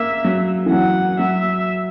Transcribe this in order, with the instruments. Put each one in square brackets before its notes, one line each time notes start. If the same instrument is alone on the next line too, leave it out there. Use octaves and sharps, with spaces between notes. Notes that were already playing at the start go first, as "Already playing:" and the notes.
Already playing: [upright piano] A#3 [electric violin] E5
[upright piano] F#3
E3
[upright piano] F#3 [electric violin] F#5
[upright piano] F#3 [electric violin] E5